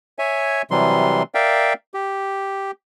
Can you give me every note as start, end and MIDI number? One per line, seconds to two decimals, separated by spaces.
0.19 0.62 73
0.19 0.62 76
0.19 0.62 80
0.71 1.23 48
0.71 1.23 52
0.71 1.23 54
0.71 1.23 55
0.71 1.23 84
1.34 1.73 70
1.34 1.73 74
1.34 1.73 76
1.34 1.73 77
1.34 1.73 79
1.94 2.71 67